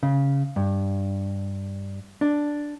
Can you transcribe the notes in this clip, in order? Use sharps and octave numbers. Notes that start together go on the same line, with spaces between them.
C#3
G2
D4